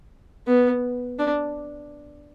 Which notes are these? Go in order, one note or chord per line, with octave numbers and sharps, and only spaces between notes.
B3
D4